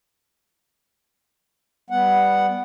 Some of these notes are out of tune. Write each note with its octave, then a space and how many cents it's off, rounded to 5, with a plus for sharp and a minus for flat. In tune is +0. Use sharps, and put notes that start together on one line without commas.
G3 +0 B3 +0 F#5 +0